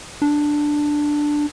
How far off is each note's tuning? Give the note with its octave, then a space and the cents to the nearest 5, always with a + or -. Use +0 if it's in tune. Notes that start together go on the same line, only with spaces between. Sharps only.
D4 +5